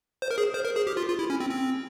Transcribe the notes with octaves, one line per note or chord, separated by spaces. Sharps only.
C5
A#4
G#4
C5
A#4
G#4
G4
F4
F4
E4
C#4
C4
C4